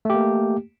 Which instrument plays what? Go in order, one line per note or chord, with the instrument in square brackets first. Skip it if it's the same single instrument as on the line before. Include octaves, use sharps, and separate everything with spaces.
[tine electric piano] A3
G4
A#3